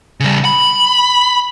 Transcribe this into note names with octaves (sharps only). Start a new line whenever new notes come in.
C#3 G3
B5